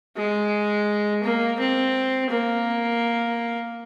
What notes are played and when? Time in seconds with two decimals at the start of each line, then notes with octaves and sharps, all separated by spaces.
0.17 G#3
1.23 A#3
1.59 C4
2.30 A#3